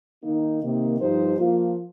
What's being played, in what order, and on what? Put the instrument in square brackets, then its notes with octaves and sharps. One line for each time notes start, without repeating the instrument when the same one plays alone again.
[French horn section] D#3 A#3 D#4
C3 D#3 A#3 D#4
G2 F3 D#4 G4 C5
F3 A#3 F4